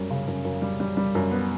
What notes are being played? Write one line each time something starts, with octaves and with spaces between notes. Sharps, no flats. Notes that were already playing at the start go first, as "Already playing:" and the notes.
Already playing: F#2 G3
C#3
F#2
F#2
G3
G3
G3
F#2
B3